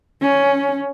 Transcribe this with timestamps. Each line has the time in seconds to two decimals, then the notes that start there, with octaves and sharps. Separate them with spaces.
0.22 C#4